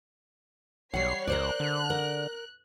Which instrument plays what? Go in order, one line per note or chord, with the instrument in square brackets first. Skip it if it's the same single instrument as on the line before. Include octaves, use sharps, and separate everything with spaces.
[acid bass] B1 [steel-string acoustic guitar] G3 F#5 [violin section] C#5 C7
[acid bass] C#2 [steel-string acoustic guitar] A#4 C5 D5 [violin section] F#6
[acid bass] D3
[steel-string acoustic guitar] A#4